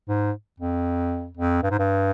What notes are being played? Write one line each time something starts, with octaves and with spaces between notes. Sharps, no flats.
G#2
F2
F2
G2
G#2
G2